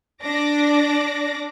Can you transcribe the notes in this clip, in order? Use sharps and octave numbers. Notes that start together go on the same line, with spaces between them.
D4 D5 D6 A#6